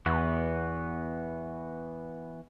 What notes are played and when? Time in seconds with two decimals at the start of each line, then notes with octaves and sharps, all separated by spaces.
0.06 E2 E3 B3 F#4